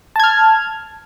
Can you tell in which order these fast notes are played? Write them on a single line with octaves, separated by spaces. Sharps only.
A5 G#6 F6